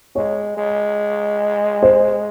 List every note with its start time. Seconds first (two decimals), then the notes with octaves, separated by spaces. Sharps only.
0.16 G#3 C#5
0.57 G#3
1.83 C5